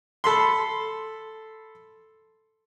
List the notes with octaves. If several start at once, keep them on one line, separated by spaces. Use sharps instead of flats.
A4 B5 C6